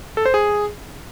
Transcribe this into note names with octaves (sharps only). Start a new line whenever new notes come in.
A4
C5
G#4